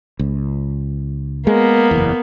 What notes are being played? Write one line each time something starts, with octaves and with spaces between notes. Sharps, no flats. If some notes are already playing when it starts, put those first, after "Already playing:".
C#2
G#3 A#3 B3
F#1 E2